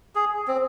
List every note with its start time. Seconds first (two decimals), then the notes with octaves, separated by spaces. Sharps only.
0.15 G#4
0.48 C4